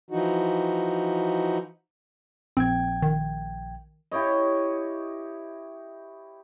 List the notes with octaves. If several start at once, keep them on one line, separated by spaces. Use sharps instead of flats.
E3 F3 D#4 F#4
A#1 C4 G5 G#6
D#3
E4 G4 C#5 D#5